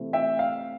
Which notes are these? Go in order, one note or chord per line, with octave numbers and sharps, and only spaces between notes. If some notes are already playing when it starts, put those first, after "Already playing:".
Already playing: C3 E3 A3 C4 E4
E5 G5
F5